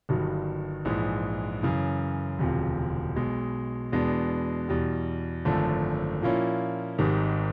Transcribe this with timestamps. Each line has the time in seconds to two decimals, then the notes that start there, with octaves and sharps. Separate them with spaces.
0.09 G1 G2 D#3 F#3
0.85 A#1 G#2 E3 G#3
1.62 F#2 C#3 E3
2.38 E1 D2 C3 F3
3.15 B1 B2 G#3
3.92 E2 B2 G#3 B3 D4
4.68 E2 B2 G3
5.45 G#1 F#2 D3 F3 A3
6.22 A#2 F3 A#3 C#4 E4
6.99 G#1 G#2 D#3 G3